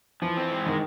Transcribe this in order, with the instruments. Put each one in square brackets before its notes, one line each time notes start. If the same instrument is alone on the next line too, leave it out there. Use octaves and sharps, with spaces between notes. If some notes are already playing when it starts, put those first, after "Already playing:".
[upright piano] E3 [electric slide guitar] F3
[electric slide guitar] C4
G#2
[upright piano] D#3 [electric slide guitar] G#3